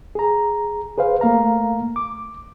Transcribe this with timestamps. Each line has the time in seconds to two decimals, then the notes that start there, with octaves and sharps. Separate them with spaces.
0.15 G#4 A#5
0.98 G#4 B4 C5 F5
1.21 A3 A#3 F5 A#5
1.96 D6